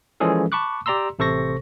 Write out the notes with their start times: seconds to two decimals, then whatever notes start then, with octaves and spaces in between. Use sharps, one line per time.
0.20 E3 F3 G#3 C#4 G#4 A4
0.52 A5 B5 C#6 D6 F#6
0.86 G4 D5 A#5 C6 E6
1.19 A1 C3 A4 C5 C#6 A#6